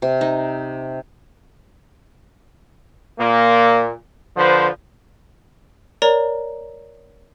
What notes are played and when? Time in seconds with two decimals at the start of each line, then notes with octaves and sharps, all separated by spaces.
0.02 C3
0.21 D#4
3.18 A#2 A#3
4.36 D3 F3 B4 C5
6.02 A#4 C#5 D5 A#5